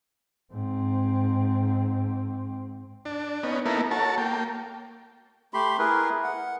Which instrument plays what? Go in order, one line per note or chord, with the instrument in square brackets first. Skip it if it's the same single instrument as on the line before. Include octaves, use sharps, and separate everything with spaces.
[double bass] G#2 C4
[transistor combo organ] D4
B3 C#4 D#4
A#3 B3 D#4 E4 A4 A#4
F#4 A4 A#4 C#5 A5
A#3 G5
[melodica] A3 G4 B5 C6
E4 G#4 A#4 B4
F#5